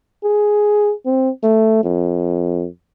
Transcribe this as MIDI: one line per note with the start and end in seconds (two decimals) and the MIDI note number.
0.24 0.93 68
1.06 1.29 60
1.43 1.80 57
1.83 2.66 41